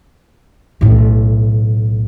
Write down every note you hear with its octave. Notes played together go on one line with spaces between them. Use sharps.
B1 A2